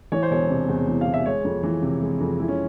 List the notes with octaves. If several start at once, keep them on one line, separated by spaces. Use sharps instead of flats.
E3 C#5
C5
E1 C#5
C3
E2
E3
F5
E1
E5
G#3 C#5
F2
E3
C3
G#3
F2
G#3 E4
C#4